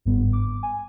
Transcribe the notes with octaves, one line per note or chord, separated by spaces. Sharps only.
G1 G#2 G3 B3
D6
G#5